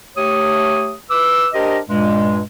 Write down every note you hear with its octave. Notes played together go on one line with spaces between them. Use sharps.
A3 G4 C#5 D#6
B4 D6 E6
D4 G4 A#4 C5 D#5
G2 A#2 G#3